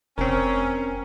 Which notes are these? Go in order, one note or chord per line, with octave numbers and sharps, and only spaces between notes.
F1 C4 C#4 A#4